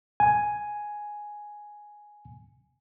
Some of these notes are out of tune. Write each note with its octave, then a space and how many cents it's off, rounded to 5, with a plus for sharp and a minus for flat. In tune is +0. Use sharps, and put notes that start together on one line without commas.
G#5 +5